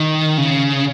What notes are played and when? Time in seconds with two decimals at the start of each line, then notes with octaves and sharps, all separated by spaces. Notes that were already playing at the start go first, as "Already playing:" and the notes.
Already playing: D#3
0.38 C#3